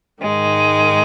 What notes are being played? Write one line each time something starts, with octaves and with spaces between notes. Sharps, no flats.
G#2 D#3 G#3